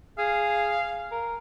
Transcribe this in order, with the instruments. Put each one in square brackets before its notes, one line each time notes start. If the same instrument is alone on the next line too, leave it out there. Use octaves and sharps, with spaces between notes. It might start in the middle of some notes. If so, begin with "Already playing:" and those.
[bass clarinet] G#4 [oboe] F5
[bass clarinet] A#4